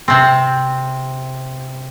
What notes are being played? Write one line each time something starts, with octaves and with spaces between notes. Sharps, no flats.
C3 C4